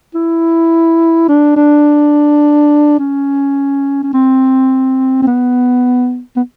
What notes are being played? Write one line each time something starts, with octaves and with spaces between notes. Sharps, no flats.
E4
D4
D4
C#4
C#4
C4
C4
B3
B3